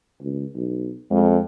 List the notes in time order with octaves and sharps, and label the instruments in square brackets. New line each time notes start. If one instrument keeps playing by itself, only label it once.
[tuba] C#2
B1
[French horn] F2 [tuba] G#3